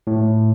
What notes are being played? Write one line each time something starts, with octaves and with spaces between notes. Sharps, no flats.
A2